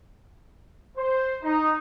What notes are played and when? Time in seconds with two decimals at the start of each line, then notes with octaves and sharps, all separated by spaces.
0.97 C5
1.43 D#4